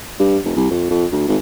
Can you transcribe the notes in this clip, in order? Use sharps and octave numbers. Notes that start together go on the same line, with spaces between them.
G2
F1
C2
F2
F2
D2
G#1